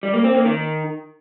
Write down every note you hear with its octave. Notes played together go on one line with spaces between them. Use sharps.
G3
A#3
C4
A#3
D#3